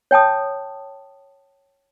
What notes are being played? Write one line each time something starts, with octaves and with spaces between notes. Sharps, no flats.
C#5 G5 A5 D#6